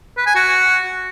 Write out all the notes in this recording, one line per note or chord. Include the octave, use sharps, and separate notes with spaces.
B4
G#5
F#4